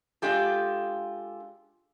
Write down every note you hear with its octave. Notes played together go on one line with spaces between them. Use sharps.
G#3 D4 F4 G4 A4